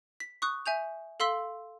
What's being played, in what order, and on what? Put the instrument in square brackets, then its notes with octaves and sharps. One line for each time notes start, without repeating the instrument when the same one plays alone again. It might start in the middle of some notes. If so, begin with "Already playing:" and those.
[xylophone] B6
C#6 D#6 F#6
E5 G#5 G6 F7
A4 F5 C6 E6 B6 G7